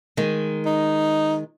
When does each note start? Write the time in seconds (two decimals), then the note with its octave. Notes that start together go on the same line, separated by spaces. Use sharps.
0.17 D#3 G#3
0.66 D#4